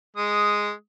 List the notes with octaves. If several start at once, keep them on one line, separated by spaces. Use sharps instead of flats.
G#3 D#6